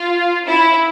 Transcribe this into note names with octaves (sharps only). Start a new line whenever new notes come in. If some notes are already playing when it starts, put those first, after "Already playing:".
Already playing: F4
E4